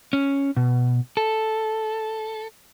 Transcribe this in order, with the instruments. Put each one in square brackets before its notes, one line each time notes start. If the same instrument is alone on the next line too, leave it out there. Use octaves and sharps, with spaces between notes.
[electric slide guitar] C#4
B2
A4